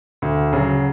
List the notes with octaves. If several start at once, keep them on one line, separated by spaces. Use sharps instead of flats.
D2
C#3 F#3